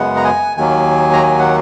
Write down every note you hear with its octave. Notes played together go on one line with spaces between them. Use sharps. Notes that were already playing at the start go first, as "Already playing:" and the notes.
Already playing: F#2 C#3 G#3 B3 F#5
A#5
G#5
D#2 D#3 F#3 A#3 G#5
A#5
G#5
F#5